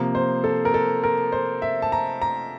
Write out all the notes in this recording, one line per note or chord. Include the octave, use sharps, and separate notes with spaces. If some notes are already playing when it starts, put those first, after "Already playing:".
Already playing: C3 F3 A#3
C5
A4
A#4
A4
A#4
C5
E5
A5
A#5
A#5